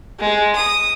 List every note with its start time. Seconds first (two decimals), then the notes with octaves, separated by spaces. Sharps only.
0.20 G#3
0.56 D#6